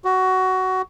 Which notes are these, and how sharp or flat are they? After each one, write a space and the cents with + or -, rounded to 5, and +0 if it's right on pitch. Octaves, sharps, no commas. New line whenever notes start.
F#4 +15